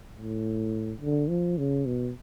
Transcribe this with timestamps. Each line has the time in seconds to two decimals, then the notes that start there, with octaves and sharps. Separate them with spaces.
0.17 A2
1.01 D3
1.29 F3
1.58 C#3
1.86 B2